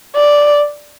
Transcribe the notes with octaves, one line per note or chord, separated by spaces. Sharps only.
D5